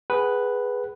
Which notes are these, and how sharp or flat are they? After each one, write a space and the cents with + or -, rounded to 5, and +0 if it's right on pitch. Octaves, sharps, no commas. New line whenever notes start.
G#4 +0 B4 +0 F#5 +35